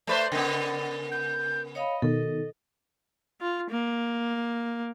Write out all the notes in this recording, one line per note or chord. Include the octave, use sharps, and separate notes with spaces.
A3 B4 C5 D5
C#3 B3 A#4
G6
C#5 D#5 F5 B5
B2 D#3 A4
F4
A#3